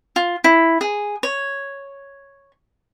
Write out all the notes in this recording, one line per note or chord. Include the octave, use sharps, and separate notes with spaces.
F4
E4
G#4
C#5